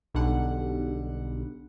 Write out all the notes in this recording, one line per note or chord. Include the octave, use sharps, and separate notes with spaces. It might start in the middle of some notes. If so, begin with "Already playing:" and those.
B1 D3 G3 F#5